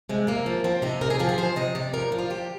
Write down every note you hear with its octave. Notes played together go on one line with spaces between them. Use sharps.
C3 G#3
C3 A#3
F3
F3 C4
C3 D#4
C3 A#4
G#4
F3 G4
G#4
F3 C5
C3 D#5
C3 D5
F3 A#4
F3
F4
C3 G4